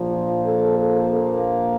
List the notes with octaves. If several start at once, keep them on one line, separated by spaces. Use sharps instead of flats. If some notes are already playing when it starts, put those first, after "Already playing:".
Already playing: A#1 A#2 F3
F4
A4
A4
A#3